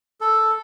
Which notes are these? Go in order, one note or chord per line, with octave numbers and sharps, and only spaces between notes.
A4